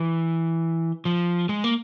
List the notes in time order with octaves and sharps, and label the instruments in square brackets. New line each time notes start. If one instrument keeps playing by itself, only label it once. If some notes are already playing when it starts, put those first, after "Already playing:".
Already playing: [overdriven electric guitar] E3
F3
G#3
A#3